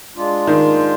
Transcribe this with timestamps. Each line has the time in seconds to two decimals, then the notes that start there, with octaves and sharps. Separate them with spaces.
0.16 G#3 D4 F4
0.47 D#3